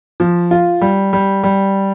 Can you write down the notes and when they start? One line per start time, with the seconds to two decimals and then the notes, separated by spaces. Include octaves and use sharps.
0.20 F3
0.51 F4
0.81 G3
1.13 G3
1.43 G3